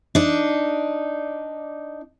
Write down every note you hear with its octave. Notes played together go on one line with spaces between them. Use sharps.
D4 D#4